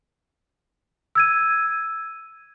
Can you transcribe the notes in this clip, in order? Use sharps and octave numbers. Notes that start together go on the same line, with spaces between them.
E6 G#6 D#7